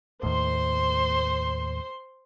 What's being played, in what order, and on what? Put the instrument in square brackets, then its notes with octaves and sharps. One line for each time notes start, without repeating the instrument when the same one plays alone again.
[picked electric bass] D#2 A2 [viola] C5 C6